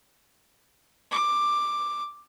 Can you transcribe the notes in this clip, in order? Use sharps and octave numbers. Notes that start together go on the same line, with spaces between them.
D6